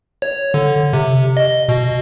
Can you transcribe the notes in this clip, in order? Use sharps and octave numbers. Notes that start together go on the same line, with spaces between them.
C#5
D3
C3
D#5
B2